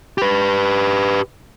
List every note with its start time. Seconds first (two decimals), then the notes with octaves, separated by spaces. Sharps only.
0.18 G4 B4